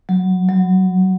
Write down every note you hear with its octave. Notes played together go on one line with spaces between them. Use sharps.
F#3
F#3